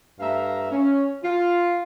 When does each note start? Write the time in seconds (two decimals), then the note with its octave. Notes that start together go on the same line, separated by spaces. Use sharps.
0.20 G2 A3 E5 F5 A#5
0.71 C#4
1.24 F4